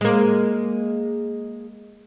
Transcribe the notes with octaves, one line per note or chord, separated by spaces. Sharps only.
G#3 A#3